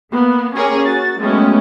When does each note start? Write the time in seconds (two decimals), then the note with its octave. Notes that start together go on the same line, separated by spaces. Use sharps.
0.11 A#3 B3
0.54 A#3 C#4 G4 G#4 A#4 C#5
0.85 F#4 A6
1.19 F#3 G#3 A3 B3 C#4 G4